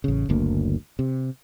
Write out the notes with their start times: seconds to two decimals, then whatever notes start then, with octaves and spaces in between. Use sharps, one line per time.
0.04 A1 C#3
0.29 F#1 D2 A#3
0.99 C3